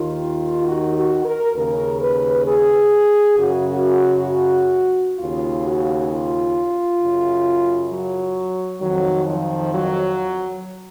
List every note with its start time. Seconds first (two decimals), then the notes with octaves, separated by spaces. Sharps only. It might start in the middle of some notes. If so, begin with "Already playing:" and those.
Already playing: D#2 D#3 F4
0.65 F#4
0.95 F#4
1.25 A#4
1.55 D#2 C#3 A#4
2.01 B4
2.46 G#4
3.37 F#2 C#3 F#4
5.18 D#2 C#3 F4
5.64 F#4
6.09 F4
7.00 F#2 C#3
7.90 F#3
8.81 F2 D#3 F#3
9.27 F3
9.73 F#3